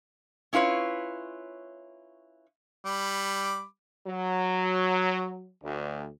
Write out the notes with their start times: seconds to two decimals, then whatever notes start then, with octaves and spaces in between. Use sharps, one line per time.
0.53 C#4 E4 F4 B4 C#5
2.85 G3 B5 D6
4.07 F#3
5.63 D2